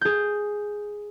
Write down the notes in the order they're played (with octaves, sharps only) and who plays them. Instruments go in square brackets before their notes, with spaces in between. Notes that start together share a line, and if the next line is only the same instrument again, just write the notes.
[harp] G#4 G6